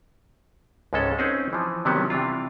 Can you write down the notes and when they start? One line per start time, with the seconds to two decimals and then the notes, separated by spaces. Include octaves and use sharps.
0.93 C#2 G#2 G#3 C#4 A4
1.18 C4 C#4 D#4 G#4 C5
1.53 E3 F3
1.85 C3 D#3 F#3 G3 B3 C#4
2.10 C3 E3 D4 F4